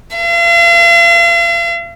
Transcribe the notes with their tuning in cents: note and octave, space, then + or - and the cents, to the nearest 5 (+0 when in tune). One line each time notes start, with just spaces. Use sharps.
F5 -45